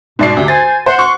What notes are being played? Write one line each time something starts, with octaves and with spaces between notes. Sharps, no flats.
G#2 B2 D5 C7
D2 C3
C5 G#5 A6
C5 F#5 C6
C#6